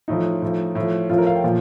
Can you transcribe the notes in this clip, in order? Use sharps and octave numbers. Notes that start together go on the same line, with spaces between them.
A2 F3 D#4
A2 F3
A2 F3
A2 F3 F4
A#4
F5
G5
A#2 F3